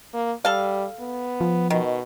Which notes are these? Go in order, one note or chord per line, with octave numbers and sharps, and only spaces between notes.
A#3
G3 A4 F5
B3
F3
B2 D#3